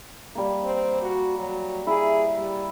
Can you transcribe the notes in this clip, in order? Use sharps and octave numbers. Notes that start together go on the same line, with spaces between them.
G3 A#3
C4
F#4
F#3
E4 G#4
G3